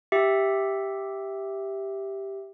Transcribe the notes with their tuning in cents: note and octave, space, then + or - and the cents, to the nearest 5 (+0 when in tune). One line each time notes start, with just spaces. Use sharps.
G4 +0 E5 +0